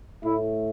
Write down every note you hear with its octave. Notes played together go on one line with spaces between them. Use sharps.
A2 A3 E4